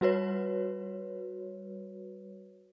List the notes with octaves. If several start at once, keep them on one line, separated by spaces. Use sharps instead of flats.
G3 F#4 B4 C#5